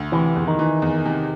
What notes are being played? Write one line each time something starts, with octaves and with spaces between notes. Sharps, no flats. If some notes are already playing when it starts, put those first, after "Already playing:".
Already playing: D2
C3 E3
E2
D#3
E3
E2
C3